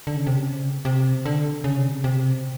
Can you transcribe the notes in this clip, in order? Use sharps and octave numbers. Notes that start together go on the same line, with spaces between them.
D3
C#3
C3
C#3
C3
D3
C#3
C3
C#3
C3